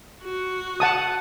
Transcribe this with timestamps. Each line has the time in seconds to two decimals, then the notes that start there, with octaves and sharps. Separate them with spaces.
0.23 F#4
0.80 F#5 A5 D#6